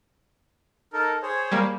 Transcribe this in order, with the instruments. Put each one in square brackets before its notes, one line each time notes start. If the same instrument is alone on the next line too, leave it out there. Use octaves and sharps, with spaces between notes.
[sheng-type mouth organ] D#4 A4 A#4
G#4 C5 C#5
[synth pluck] G3 A#3